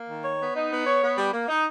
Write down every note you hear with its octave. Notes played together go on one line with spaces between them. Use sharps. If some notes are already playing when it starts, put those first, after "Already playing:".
Already playing: A#3
D#3
C#5
B3
D#4
B3
C#5
B3
G3
A#3
D#4